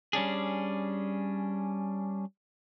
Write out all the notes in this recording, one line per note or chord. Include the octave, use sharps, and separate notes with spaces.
G3 C#4 D4 G#4